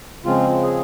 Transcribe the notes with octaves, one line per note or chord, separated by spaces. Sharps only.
C#3 F3 G#3 C4 F4
G#4